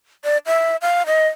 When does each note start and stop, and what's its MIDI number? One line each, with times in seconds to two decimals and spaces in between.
0.24 0.38 74
0.47 0.76 76
0.82 1.06 77
1.07 1.28 75